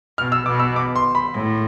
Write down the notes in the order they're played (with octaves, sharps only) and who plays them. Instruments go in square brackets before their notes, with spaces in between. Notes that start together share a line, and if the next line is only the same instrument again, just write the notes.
[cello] B2 [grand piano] F6
[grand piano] E6
[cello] B2 [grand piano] D6
[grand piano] E6
D6
C6
B5
[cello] A2